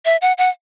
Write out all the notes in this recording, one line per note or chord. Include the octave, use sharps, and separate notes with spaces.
E5
F#5
F#5